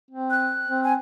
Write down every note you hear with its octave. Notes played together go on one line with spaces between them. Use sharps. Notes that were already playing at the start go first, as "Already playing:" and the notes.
C4
F#6
C4
G#5